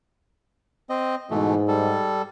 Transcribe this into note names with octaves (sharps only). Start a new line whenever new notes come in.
C4 D#5
G#2 B2 E3 A3
G3 A4